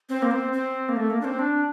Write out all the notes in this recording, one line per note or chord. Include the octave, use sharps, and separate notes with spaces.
C4
A#3
C4
C4
A#3
A3
A#3
D4
C4
D4